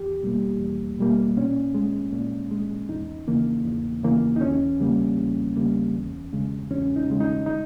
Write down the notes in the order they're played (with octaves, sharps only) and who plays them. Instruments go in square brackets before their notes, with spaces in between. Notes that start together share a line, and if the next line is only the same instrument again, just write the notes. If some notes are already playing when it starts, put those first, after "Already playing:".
Already playing: [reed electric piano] E2 G4
B2 G3 A#3
E2
B2 G3 A#3
A#2 C#4
G#3
A#2
G#3
E2 D#4
C#3 E3 A#3
E2
C#3 E3 A#3
D#4
E2 C#4
C#3 G3 A#3
E2
C#3 G3 A#3
E2
C#3 G#3
E2 C#4
D#4
C#3 G#3
D#4
D#4